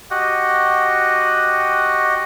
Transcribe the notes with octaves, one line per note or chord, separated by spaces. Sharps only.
F#4 G4 D#5 F#5